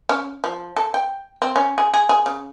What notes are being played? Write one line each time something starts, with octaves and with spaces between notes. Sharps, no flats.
C#4
F3
A4
G5
C4
C#4
G#4
G#4
G#4
C#3